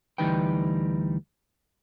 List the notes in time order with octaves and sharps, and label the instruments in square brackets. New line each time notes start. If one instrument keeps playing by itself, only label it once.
[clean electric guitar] D2 E3 G3 D#4 B4 G5